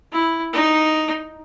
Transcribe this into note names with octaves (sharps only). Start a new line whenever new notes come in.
E4
D#4